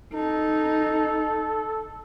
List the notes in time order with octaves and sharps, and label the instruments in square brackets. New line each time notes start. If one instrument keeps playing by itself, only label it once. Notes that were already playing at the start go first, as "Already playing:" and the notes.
[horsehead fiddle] D#4 [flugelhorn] A4